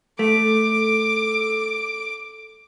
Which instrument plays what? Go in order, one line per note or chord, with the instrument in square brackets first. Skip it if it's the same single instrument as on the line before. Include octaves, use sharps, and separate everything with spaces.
[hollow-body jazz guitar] A3 [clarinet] A4 [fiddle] D6